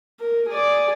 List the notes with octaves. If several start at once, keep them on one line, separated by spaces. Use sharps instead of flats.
A#4
G#4 D5